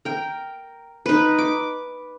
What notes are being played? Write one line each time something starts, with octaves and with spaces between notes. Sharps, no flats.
A#4 G5
D#4 B4
D6